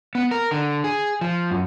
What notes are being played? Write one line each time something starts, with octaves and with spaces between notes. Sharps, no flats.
B3
A#4
D3
G#4
F3
F#2